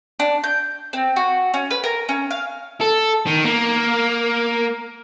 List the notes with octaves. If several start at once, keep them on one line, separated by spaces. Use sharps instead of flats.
D4
G6
C4
F#4
C#4
B4
A#4
C#4
F5
A4
D#3
A#3